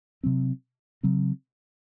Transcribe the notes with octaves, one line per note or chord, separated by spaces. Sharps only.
C3 F#3 C4
C#3 F#3 C4